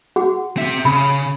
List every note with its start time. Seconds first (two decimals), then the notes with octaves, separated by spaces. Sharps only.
0.16 F#4 G#4 F#5
0.57 C4 E5
0.85 C#3 B5